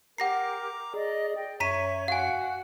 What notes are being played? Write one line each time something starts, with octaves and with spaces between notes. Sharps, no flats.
G4 A#4 F#5 A#5 D6 A#6 C7
G#4 D5 D#5
G5
F#2 C#5 E5 A#5 C#6 B6 D#7
F#4 F5 F#5 G#5